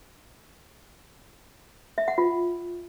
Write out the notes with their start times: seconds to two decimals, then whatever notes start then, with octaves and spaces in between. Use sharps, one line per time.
1.98 E5
2.08 F#5
2.18 F4